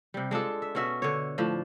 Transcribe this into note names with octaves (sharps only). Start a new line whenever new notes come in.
C3 G3
G#3 D4 F4 A4
E5
B2 C#4 F#4 E5
D3 C#5
A2 F3 D4